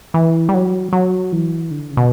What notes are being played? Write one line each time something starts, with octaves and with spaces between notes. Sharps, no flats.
E3
G3
F#3
F#3
E3
D3
C#3
B2